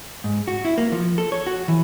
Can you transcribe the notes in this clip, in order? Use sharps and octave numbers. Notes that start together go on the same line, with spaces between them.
G#2
F#4
E4
A#3
F3
A4
C#5
F#4
E3